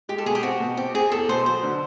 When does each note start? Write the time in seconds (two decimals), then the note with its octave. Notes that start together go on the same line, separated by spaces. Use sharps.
0.09 G#3 G4
0.18 A4
0.26 B2 G#4
0.35 G4
0.43 C4 F#4
0.60 B2
0.77 C4 G4
0.94 C4 G#4
1.12 E2 A4
1.29 B2 C5
1.46 F#3 C5
1.63 D3